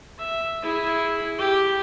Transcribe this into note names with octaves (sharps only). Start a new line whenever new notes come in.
E5
E4 G#4
G4